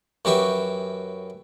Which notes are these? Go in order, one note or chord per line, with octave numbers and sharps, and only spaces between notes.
F#2 F#4 G4 B4 E5 C#6